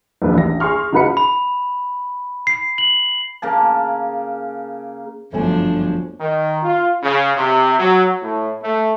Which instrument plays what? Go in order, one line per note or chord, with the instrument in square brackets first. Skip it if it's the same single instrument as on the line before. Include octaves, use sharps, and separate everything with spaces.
[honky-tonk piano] A#1 D#2 B4
A1 A#6
G#4 C6 C#6 F6
C#3 D#4 F#4 B4 B5 C#7
[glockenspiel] B5
C7
F#7
[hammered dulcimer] C#3 A#3 A5
[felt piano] G1 A3 G#5 [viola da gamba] F#2 F3 D4
[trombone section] D#3
F4
C#3
C3
F#3
A2
A3